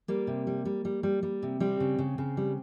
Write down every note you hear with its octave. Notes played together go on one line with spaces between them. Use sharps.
G3 A#3
C3
G3
G3
G3
G3
G3
C3
G3 C4
C#3
C#3
C#3
G3